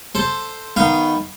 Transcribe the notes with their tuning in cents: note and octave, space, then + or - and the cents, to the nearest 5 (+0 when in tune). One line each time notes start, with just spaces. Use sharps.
A4 +0 C5 +0
D#3 +0 B3 +0 F5 -20